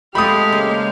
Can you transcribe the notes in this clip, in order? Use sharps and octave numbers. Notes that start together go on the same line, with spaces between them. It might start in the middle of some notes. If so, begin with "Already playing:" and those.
G#3 A3 C4 G4 A4 F5 B5 D#6
C#3 A#3